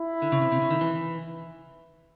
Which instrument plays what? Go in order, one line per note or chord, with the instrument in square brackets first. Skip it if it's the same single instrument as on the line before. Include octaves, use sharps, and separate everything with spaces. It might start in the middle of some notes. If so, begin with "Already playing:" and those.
Already playing: [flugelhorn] E4
[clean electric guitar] D3
C#3
C3
C3
C#3
D#3
E3